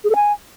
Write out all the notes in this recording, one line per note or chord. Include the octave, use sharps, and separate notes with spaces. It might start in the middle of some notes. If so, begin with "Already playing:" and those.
G#4
A4
G#5